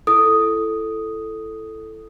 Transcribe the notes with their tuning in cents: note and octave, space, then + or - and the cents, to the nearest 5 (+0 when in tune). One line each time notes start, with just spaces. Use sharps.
E4 +20 A4 +0 D#6 +0